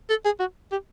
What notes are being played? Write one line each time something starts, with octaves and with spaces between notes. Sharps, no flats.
A4
G#4
F#4
G4